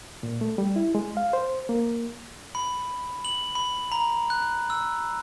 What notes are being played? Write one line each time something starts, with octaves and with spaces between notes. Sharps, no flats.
A#2
A3
G3
E4
G#3
F5
C5
A#3
B5
F#7
B5
A#5
F#6
E6